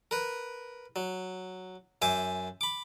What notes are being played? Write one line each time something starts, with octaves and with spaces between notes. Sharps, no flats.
A#4 B4
F#3
F#2 C5 E5 G#5 D6
B5 D6